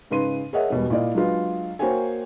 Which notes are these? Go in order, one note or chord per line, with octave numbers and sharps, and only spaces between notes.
G#2 C#3 B4 C6 D#7
G#4 A#4 C#5 D#5 E5 F#5
E1 B2 G3
A#2 E4 D5 D#5 F5
F#3 G#3 D4 F4 B4
A#3 F#4 C5 C#5 G5 G#5